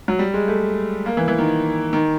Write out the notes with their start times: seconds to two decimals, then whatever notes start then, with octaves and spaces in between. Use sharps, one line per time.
0.08 F#3
0.19 G3
0.34 G#3
0.48 A3
1.06 A#3
1.17 E3
1.28 E3
1.38 D#3
1.93 D#3